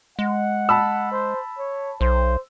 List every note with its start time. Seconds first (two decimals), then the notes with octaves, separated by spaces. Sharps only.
0.19 G#3 F#5
0.69 A5 B5 E6
1.12 C5
1.58 C#5
2.01 B1 C5